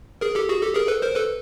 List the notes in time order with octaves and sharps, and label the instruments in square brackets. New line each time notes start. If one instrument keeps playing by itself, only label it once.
[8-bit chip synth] G#4 A#4
G4 A4
F#4 G#4
G4 A4
G#4 A#4
A4 B4
A#4 C5
A4 B4